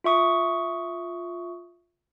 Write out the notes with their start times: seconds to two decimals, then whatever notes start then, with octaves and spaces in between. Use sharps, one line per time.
0.04 F4 E5 C#6 D#6